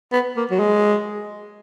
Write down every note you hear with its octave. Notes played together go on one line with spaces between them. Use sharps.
B3
A#3
F#3
G#3